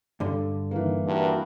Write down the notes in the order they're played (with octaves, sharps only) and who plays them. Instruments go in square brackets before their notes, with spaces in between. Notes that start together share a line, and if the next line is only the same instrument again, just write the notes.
[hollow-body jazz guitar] G2 D3
[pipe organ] D#3 [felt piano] E3 A#3
[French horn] G2 [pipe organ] E4 F#4 A#4